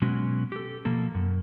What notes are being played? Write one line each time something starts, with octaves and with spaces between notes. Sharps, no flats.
B2 F#3 G#3 B3 C#4 F#4
G4 A4
B2 F3 A#3 A4
F#2